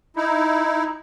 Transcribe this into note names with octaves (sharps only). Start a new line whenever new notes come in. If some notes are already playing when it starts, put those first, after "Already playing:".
D#4 E4